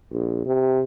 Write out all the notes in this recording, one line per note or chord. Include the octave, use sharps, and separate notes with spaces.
A#1
C3